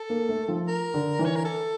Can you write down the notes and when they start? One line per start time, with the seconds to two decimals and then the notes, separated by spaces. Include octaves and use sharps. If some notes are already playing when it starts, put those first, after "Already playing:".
Already playing: A4
0.10 A#3
0.29 A3
0.48 F3
0.68 A#4
0.94 D3
1.19 E3
1.25 C#5
1.35 A#4
1.45 A4